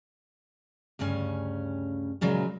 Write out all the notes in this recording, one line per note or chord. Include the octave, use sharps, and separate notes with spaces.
D2 G2 C#3 C#4
A#2 C#3 F#3 G#3